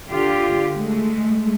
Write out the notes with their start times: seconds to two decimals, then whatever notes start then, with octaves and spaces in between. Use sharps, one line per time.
0.11 D3 F4 G4
0.75 G#3 A3